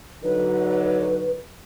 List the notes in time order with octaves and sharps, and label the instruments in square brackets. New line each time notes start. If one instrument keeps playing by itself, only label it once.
[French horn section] D3 F#3 D#4 [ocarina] B4